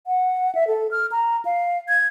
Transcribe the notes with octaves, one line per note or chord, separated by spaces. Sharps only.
F#5
E5
A4
F6
A#5
F5
G#6